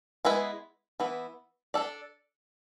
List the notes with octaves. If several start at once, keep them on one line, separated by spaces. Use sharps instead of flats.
G#3 B3 E4 G#4 B4
E3 B3 E4
D4 A4 D5